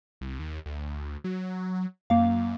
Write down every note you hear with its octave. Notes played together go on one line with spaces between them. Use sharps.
C2
D#2
D2
F#3
F#2 A#3 F5